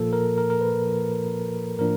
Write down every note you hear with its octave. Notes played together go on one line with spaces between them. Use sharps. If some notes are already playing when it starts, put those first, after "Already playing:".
Already playing: A#2 F3 A#3 A4
A#4
A#4
A#4
B4
A#2 F3 A#3
A2 F3 A#3 D4 A#4